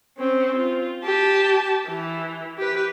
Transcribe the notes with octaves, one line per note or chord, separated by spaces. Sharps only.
C4 C#4
F4
G4 A5
E3
G4 B4